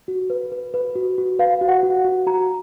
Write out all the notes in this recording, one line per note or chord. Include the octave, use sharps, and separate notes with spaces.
F#4
B4
B4
B4
F#4
F#4
B4 F5
F#4
F#5
F#4
F#4
F#4 A#5